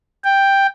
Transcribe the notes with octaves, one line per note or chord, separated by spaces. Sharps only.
G5